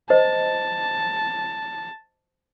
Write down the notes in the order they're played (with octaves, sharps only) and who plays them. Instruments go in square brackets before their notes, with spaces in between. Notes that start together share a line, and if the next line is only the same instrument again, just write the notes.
[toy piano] C5 D#5 [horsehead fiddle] A5